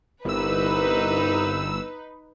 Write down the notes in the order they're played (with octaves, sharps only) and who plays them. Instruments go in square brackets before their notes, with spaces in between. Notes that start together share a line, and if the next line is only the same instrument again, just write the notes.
[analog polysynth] G1 E6 [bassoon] C2 [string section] D#4 B4